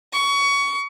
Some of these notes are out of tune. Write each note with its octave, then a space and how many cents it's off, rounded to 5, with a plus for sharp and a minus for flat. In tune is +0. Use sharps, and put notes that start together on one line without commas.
C#6 +25